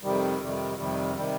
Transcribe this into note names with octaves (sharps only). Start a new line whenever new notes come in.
F2 C3 D#3 G3
F2 C3 D#3 G3
F2 C3 D#3 G3
C3 D#3 G3